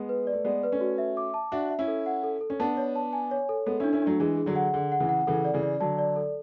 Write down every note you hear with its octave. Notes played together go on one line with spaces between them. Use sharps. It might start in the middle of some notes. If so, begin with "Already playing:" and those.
Already playing: G#3 B3
B4
D5
A3
G#3 B3 D5
B4
A3 C#4
F#4
E5
D6
A5
D4 F#4 E5
E5
C#4 E4
A4
F#5
A4
A4
C#4
B3 D4 A5
C#5
A5
G#5
C#5
A4
G#3 B3 A4
C#4 D4 E4
C#4 E4
F#3 A3 D4
E3 G#3 G#4
G#4
D3 F#3
F#5
D3 G#4
F#5
C#3 E3
F#5
C#3 E3 A4
D5
C#3 E3
D5
D3 F#3 A5
D5
A4